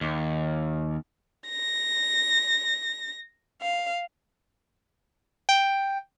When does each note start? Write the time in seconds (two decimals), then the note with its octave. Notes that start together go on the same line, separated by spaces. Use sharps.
0.01 D#2
1.50 A#6
3.62 F5
5.49 G5